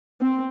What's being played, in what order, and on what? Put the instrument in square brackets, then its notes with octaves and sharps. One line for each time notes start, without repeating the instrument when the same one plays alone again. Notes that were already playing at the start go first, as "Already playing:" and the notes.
[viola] C4